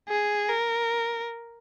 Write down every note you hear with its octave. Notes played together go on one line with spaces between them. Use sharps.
G#4
A#4